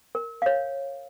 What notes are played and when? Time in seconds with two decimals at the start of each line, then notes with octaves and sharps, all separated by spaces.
0.15 A#4
0.42 C#5 F5